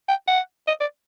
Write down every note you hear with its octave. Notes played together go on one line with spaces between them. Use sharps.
G5
F#5
D#5
D5